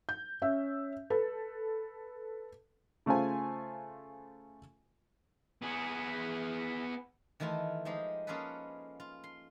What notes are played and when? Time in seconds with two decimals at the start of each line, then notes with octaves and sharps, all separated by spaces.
0.09 G6
0.42 C#4 E5
1.10 A4 B4
3.06 C#3 A3 F4 C5 G#5
5.62 B3 G#4
7.40 D#3 E3 A3 E4 F4
7.85 F3 G#3 D#4 G4
8.27 A#3 C#4 F4 G#4 A4 B4
9.00 F4
9.24 C6